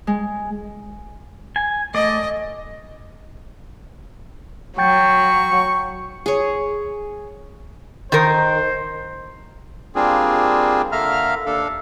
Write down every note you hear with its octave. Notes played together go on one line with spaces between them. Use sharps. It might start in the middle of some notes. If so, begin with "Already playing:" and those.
G#3
G#5
A3 D5 D#5
F#3 G5 C#6 G6 A6
G#4 C#5
D#3 D#4 A#4 C5
G3 A#3 C4 D4 F4 G#4
D3 A#3 E5 F5 A#5 F6
D#2 D4 A4 F5